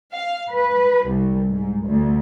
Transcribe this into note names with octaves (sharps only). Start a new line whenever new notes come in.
F5
B4
C2
G#2
D2